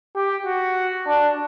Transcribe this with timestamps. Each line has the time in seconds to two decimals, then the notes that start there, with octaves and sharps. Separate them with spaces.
0.16 G4
0.46 F#4
1.07 D4